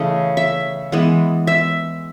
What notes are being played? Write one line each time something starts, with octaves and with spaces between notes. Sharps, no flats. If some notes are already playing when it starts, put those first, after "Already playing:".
Already playing: C#3 E3 A3 D#5
E5
E3 G#3 B3
E5